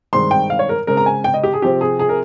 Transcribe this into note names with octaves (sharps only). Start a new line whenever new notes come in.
G2 D#3 G#3 C4 C6
G5
F5
C#5
A#4
C#3 G#3 C4 A#4
A#5
G#5
G5
D#5
G4
G#4
C3 F3 C4 G4
G#4
G#4
A#4